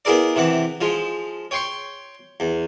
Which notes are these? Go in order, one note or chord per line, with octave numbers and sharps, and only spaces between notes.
B3 E4 G#4 A#4 D5
C3 E3 F#5
F3 G#3
C#5 G5 C6 C#6
E2